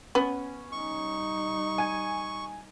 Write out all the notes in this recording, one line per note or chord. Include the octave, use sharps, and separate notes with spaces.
B3 C#4
G3 D#4 C#6
G#5 G#6